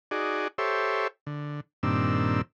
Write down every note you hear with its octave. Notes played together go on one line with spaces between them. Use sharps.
D#4 F#4 G#4 D5
G4 A4 C5 C#5 E5
D3
G2 A#2 D#3 C4 D4 E6